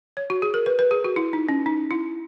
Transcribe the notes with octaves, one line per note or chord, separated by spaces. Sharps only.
C#5
F#4
G#4
A#4
B4
B4
G#4
F#4
E4
D#4
C#4
D#4
E4